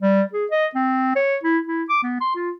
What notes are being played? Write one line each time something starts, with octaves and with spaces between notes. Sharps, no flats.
G3
G#4
D#5
C4
C#5
E4
E4
D6
B3
C6
F4